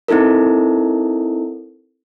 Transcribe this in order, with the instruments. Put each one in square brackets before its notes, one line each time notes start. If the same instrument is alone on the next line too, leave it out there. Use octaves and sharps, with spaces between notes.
[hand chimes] C4 D#4 E4 A4 A#4